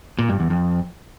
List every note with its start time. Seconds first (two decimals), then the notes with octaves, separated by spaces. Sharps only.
0.19 A#2
0.29 G2
0.40 E2
0.50 F2